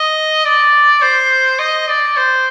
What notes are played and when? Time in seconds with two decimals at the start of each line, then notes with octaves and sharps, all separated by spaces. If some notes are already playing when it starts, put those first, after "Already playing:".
Already playing: D#5
0.44 D5
1.02 C5
1.59 D#5
1.88 D5
2.17 C5